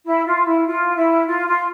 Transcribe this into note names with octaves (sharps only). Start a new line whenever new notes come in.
E4
F4
E4
F4
E4
F4
F4